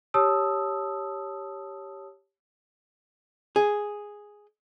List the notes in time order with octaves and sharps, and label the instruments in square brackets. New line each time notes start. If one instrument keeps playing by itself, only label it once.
[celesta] G4 C#5 A5 D#6 E6
[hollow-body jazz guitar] G#4